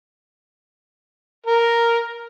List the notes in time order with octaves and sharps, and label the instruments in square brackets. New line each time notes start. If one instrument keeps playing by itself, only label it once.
[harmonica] A#4